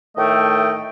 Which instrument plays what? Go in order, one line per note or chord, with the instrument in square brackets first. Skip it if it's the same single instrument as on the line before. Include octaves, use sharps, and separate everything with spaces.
[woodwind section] A2 D#3 A3 D#5 G5